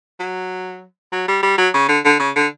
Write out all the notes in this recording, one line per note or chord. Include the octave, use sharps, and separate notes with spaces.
F#3
F#3
G3
G3
F#3
C#3
D3
D3
C#3
D3